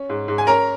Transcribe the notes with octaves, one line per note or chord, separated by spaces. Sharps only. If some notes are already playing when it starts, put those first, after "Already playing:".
Already playing: C#4
G#2
G#2
G#5
C#4 A#4 A#5